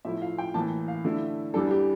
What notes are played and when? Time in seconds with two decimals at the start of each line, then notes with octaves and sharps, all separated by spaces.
0.05 A2 F3 A3 E4 E5
0.22 F5
0.38 G5
0.54 A2 E3 A#3 A5
0.88 F5
1.05 D3 A3 E4
1.54 E2 E3 G3 D4 A4
1.71 G4